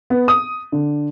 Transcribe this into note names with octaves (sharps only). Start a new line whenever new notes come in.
B3
D#6
D3